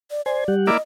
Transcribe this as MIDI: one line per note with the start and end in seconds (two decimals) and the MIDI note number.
0.11 0.21 74
0.26 0.44 72
0.26 0.54 74
0.26 0.44 80
0.48 0.70 55
0.48 0.70 67
0.48 0.70 78
0.67 0.77 58
0.67 0.77 64
0.67 0.77 74
0.67 0.82 75